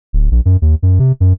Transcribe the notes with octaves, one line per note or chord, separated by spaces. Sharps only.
D1
A#1
F#2
D#2
F#2
C3
F#2